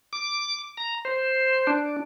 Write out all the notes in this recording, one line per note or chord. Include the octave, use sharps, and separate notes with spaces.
D6
A#5
C5
D4